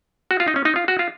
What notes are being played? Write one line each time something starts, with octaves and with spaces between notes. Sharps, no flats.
F#4
F4
D#4
C#4
D#4
F4
F#4
F4